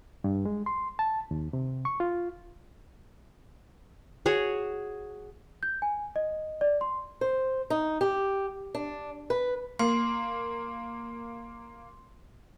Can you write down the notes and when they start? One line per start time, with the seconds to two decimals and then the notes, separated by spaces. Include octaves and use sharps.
0.24 G2
0.45 G#3
0.66 C6
0.99 A5
1.31 D#2
1.53 C3
1.85 C#6
2.00 F4
4.26 F#4 G#4 C#5
5.63 G6
5.82 G#5
6.16 D#5
6.61 D5
6.81 C6
7.21 C5
7.70 D#4
8.01 G4
8.75 D4
9.30 B4
9.79 A#3 C6